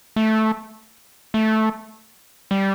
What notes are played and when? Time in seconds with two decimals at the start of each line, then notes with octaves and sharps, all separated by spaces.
0.16 A3
1.34 A3
2.51 G3